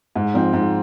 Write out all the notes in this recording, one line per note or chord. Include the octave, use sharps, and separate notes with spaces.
G#2
F3 C4 D#4
G#2